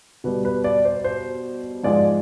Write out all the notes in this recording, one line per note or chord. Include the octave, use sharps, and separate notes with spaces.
B2 G3 B4
B4
D5
C5
C5
G#2 F3 G#3 D5